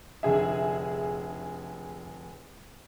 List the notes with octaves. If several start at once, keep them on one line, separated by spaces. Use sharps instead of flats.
F1 D3 G#4 E5